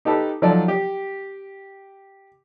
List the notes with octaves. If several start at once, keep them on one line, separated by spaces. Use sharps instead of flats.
D#4 G4 A4 B4
F3 F#3 D#4 A4 D5
G4